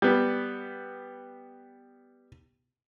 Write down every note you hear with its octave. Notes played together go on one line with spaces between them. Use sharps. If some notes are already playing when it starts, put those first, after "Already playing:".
G3 B3